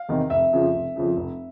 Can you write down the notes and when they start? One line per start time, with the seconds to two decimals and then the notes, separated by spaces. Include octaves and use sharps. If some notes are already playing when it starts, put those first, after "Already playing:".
Already playing: F5
0.09 E2 C3 D#3
0.30 F1 E5
0.53 F2 C#3 F3
0.74 F1
0.96 F2 C#3 F3
1.17 F1